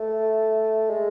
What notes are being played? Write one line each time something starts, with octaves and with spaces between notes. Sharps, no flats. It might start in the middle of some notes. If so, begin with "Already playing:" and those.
Already playing: A3
G#3